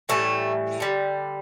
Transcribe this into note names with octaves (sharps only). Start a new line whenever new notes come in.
A2 E3 G3 A3
D3 G3